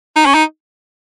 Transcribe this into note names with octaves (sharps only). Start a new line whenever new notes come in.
D#4
C#4
D#4